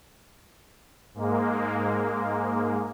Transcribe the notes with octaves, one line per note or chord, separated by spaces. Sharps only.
G#2 G#3 A#3